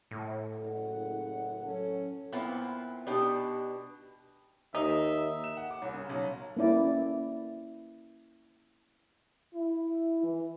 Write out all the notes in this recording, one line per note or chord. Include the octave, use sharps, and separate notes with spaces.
A2
F#1 F#5
F#3 C#4 A4
A#2 B3 C4 E4 F4
B2 B3 D4 D#4 G4
D#2 D#4 E5
E7
F#5
D6
C2
C#3
B1
A#3 C#4 E4 D5
E4
E3